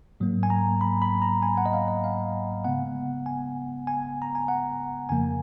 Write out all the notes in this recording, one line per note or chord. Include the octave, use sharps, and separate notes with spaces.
G#2 F#3 A#3
G#5
A#5
B5
B5
A#5
G#5
F#5
D#5
F5
D#5
F5
C#3 G#3 B3 F#5
G#5
G#5
A#5
G#5
F#5
F2 C#3 F3 A#3 G#5